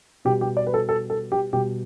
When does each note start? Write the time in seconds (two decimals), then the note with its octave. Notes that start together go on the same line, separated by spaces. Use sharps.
0.25 B2 G4
0.29 G3
0.41 G4
0.57 D5
0.67 B4
0.74 A4
0.89 A4
1.10 A4
1.32 G4
1.53 B2 G3 G4